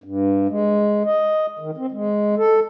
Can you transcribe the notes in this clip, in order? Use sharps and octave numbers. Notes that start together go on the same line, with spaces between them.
G2
G#3
D#5
D#3
C4
G#3
A4